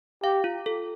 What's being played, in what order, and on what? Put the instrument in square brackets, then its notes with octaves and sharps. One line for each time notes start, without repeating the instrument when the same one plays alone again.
[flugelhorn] G4 [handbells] F5
[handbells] F4
A4